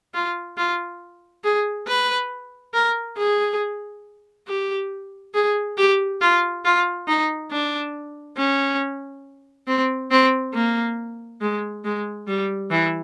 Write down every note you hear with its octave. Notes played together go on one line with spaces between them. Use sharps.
F4
F4
G#4
B4
A#4
G#4
G4
G#4
G4
F4
F4
D#4
D4
C#4
C4
C4
A#3
G#3
G#3
G3
E3